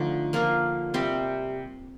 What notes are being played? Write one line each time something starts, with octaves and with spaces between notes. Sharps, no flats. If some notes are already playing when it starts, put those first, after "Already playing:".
Already playing: D3 F3 A3 D#4
F3 A#3 F4 A#4
C3 G3 C4 G4